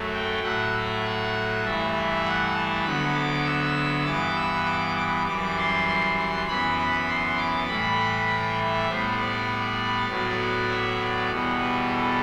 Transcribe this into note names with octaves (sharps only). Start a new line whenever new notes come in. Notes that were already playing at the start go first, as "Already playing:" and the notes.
Already playing: F#2 F#3 A3
G5
A2 F#3 A3 F#5
E5
F#5
G2 E3 A3 E5
F#5
A5
D2 D3 F#3 B3 B5
D6
E6
G2 E3 B3 D6
E6
D6
D6
F#2 E3 G3 D6
C6
C6
C6
F#2 E3 B3 B5
B5
C6
D6
A2 E3 G3 B5
G5
E5
A2 G3 B3 C5
D5
A2 F#3 B3
E5
D5
E2 B2 G3 B3
B4
A4